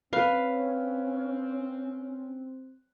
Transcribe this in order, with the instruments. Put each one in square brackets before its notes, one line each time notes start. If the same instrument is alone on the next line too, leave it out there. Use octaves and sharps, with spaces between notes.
[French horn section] C4 [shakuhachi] C#4 [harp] B4 [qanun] F5